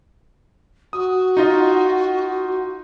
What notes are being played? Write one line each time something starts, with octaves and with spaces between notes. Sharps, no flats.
F#4 D#6
D#4 F4 D#5